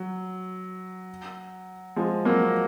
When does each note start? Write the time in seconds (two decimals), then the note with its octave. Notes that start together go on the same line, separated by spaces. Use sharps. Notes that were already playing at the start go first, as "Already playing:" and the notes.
Already playing: F#3
1.96 F3 G#3
2.25 F#3 A#3